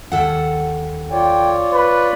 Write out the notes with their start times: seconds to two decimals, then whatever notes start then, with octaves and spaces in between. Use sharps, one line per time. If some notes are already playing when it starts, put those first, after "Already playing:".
0.12 D#2 A4 F#5
1.11 F4 C#5 D5 G5
1.74 B4